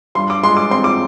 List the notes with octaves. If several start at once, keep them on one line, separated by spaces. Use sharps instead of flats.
G2 C6
D6
G#3 C6
D6
C4 C6
D6